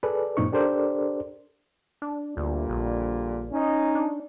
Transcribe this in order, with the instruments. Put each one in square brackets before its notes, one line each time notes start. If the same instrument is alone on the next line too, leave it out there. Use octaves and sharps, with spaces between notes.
[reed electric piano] G#4 A4 B4 D5
F#2 A#2 C4 D#4 C#6
D4 G4 A4 A#4 C5 D5
[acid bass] D4
[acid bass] D2 [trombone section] A#2 D3 G3
[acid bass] A#1
[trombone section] C#4 D#4
[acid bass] D4